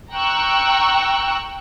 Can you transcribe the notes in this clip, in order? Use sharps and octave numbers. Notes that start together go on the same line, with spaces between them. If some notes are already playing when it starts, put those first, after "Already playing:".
G5 A#5 C#6 E6 F#6